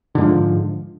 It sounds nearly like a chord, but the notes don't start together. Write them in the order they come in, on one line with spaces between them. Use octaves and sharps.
D3 G#2 F3